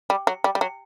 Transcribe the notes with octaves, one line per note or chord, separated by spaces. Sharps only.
G3
F#3
G3
G3
F#3